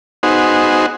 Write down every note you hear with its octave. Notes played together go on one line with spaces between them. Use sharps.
B3 D#4 F#4 G#4 C5